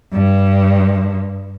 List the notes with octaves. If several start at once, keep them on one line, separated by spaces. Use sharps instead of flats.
G2